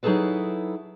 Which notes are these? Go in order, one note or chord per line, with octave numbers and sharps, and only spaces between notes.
F#3 D#4 E4 G#4 A4 B4